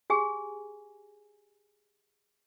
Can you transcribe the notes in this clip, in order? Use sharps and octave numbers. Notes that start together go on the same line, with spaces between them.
G4 G#4 G#5